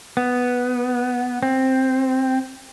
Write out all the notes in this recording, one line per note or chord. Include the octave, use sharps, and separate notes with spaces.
B3
C4